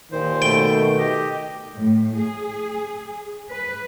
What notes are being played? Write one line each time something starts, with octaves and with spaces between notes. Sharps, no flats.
D#2 A#2 D#3 C5
B2 A3 G5
G4 D#5
A2
G#4
B4